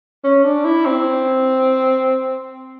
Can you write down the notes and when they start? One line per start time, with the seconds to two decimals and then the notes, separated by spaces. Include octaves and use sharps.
0.24 C#4
0.44 D4
0.65 E4
0.86 C4